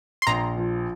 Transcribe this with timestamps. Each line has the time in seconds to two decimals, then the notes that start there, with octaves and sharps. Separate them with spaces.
0.22 C6
0.27 A#1 A#5
0.57 F3